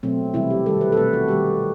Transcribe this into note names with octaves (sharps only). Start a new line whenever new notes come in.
B2 F#3 A3 C4
C3 E3 G3 E4
G4
D#3 G3 A4
B4
A4
B2 A3 B4
F#4
D#3 G3 G4